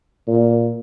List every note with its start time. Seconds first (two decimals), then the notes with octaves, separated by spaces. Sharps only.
0.28 A#2